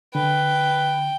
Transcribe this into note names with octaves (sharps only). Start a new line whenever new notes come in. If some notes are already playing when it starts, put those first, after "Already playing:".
D3 B4 G5